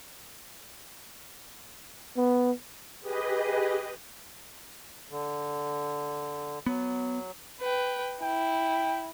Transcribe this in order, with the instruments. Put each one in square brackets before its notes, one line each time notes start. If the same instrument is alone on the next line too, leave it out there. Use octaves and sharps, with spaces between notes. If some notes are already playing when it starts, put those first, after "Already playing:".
[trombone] B3
[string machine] G4 G#4 B4 D#5
[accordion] D3
[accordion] F#3 [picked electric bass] B3
[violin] B4 G5
[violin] E4 [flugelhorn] G5